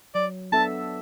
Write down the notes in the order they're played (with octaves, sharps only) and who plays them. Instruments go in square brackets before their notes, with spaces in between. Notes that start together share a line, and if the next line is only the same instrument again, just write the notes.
[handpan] F#3 [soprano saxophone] D5
[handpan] B3 D4 A4 E5 [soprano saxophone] A5